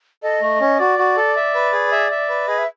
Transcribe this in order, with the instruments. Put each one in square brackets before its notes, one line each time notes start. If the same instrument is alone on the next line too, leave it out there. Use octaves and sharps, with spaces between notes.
[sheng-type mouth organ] A4 [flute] D#5
[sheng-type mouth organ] A3
C#4
[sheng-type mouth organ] F#4 [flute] D5
[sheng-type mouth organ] F#4
A4
E5
B4
G#4
E5
E5
B4
[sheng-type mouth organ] G#4 [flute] D#5
[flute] E5